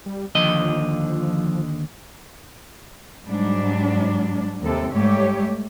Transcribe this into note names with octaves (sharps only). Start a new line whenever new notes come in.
G3
D#2 D3 F3 D#5
G#2 F#3 G3 D4
D#2 C3 A4
G#2 G3 A3 G4 C#5